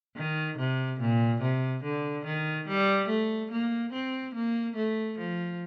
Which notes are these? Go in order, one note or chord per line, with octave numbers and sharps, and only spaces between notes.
D#3
C3
A#2
C3
D3
D#3
G3
A3
A#3
C4
A#3
A3
F3